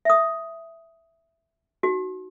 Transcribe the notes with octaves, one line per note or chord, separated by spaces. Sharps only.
E5 D#6
D#4 F#4